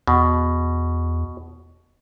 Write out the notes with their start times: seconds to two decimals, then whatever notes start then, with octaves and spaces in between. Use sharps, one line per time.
0.07 E2 B2